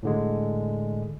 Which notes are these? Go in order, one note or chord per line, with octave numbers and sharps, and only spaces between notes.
A2 D3 G#3